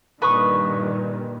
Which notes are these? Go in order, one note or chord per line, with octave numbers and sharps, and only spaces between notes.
G2 A#2 D#3 B4 C#6 D#6